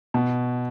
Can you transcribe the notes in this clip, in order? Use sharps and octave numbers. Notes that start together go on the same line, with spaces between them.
B2